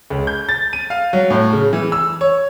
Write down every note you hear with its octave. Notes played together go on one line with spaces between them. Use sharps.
C#2
G6
A6
D#7
F5
F#3
A2
C#3
E3
E6
C#5